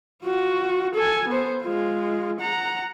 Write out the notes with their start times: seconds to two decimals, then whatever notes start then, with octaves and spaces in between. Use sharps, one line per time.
0.23 F4 F#4
0.95 A4 G#5
1.28 B3 C5
1.63 G#3 F4
2.40 F#5 A#5